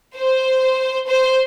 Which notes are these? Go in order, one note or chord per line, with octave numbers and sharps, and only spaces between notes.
C5
C5